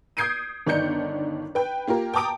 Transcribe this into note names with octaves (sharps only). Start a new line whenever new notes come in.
D#6 G6 G#6 C7 D7 D#7
G1 D#3 D4 D#4 G6 C#7
B4 G5
A#3 F4 G4 A#4
G5 A5 A#5 D6 D#6 D7